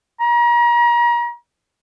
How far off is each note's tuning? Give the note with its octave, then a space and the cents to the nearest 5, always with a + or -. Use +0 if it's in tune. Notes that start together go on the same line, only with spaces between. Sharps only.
A#5 +35